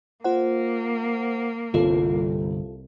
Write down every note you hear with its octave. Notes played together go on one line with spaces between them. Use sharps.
A#3 F4 C5 F#5
G1 C2 F4 A4